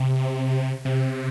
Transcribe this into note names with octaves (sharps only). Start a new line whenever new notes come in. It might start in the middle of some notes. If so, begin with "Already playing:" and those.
Already playing: C3
C3